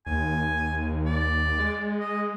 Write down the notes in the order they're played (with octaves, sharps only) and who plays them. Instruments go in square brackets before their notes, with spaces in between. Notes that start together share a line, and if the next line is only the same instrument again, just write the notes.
[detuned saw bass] D#2 [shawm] G#5
[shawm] D5
[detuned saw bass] G#3
[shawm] D#5